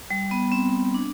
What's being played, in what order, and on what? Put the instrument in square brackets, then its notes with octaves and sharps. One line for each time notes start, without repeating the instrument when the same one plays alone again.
[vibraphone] G3
B3
C4
D4